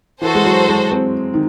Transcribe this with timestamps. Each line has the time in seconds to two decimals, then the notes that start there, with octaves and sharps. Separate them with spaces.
0.22 E3 F#4 A4 C5
0.35 G#3
0.45 F#3
0.69 G#3
0.92 C4
1.34 D#3